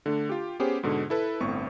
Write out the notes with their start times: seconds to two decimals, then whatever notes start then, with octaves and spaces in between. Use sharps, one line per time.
0.06 D3 A3 D4
0.29 F4 G4
0.60 B3 C#4 G4 G#4 C5
0.83 G#2 B2 D3
1.10 E4 A4 B4
1.40 G1 A2 B3 C4 C#6